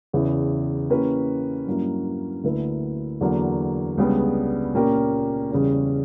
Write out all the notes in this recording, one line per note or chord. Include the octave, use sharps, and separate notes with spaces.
E2 C#3 E3
E3 A#3 C#4 G4 B4
G2 F#3 A#3 C#4 E4
D2 D3 A#3 E4 B4
E2 D3 F#3 A#3
C#2 C#3 G3 B3 D4
A#2 A#3 C#4 G4 A#4
E2 C#3 G3 C#4